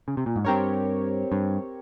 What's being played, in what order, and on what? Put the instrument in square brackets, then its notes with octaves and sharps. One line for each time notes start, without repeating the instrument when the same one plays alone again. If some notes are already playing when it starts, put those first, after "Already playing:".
[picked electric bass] C#3
C3
A#2
G#2
[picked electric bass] G2 [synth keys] C4 G4 A#4 C#5
[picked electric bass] G2